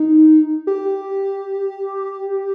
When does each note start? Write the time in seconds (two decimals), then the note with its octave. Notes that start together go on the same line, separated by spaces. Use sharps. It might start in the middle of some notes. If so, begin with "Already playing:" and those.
Already playing: D#4
0.67 G4